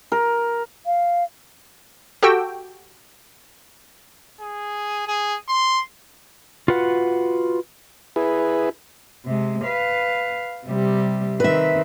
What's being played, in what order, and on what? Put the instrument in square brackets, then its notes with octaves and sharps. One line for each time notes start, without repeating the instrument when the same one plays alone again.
[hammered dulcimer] A#4
[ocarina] F5
[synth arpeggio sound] F#4 G4 A4 G5 E6
[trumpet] G#4
G#4
C6
[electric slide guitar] F4 F#4 B4 F#5
[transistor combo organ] E4 G#4 B4
[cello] C3 G#3
B4 F5
C3 G3
[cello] D#3 C4 [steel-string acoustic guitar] B4 E5